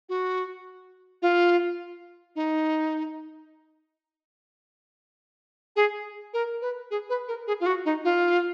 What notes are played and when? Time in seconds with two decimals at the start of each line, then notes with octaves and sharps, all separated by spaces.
0.09 F#4
1.22 F4
2.36 D#4
5.76 G#4
6.34 A#4
6.62 B4
6.91 G#4
7.10 B4
7.28 A#4
7.47 G#4
7.61 F4
7.66 F#4
7.85 D#4
8.04 F4